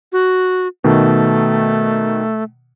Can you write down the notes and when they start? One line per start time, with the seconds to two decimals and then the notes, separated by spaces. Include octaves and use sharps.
0.12 F#4
0.84 B2 D#3 A3